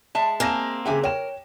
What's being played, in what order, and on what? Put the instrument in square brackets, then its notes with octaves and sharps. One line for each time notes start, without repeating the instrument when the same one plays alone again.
[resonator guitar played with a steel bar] G#3 E5 A5
[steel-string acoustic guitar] A#3 C4 [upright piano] G#5 A#6 E7
[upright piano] C#3 E5 G5 [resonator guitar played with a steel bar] F#3 G4 G#5
[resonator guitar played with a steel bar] A#4 [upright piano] C#5 G5 E7